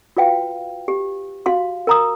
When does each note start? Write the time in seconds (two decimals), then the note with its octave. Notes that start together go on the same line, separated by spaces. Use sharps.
0.17 F4 F#4 B4 F5 G5
0.88 G4
1.46 F#4 F5 C6
1.87 A#4 A#5 D#6